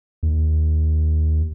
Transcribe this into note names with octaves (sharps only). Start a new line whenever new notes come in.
D#2